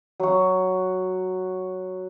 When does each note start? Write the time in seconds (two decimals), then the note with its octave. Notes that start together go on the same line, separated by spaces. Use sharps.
0.20 F#3 F#4